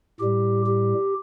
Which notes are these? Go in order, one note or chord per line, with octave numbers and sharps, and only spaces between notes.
A2 G3 G4
G4